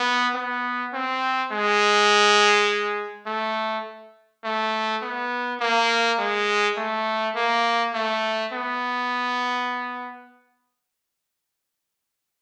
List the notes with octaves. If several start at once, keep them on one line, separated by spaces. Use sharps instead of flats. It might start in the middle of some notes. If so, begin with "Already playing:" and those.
Already playing: B3
B3
C4
G#3
A3
A3
B3
A#3
G#3
A3
A#3
A3
B3